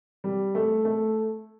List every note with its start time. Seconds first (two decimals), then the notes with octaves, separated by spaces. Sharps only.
0.24 G3
0.55 A3
0.85 A3